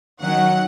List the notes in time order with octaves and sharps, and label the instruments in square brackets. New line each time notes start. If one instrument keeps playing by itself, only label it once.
[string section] D#3 F#3 C#4 F#5